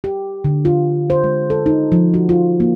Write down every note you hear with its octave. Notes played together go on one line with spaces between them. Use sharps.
G4
D3
F4
C5
G#3
A4
D#4
F3
F#4
F4
A#3